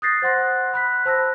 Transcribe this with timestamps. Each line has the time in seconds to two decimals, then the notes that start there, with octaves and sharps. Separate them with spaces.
0.02 D#6 F#6 G6 A6 A#6 C7
0.22 C5 F#5 C6 F#6
0.74 B5 F#6 B6
1.05 C5 A5 E6 F#6 A#6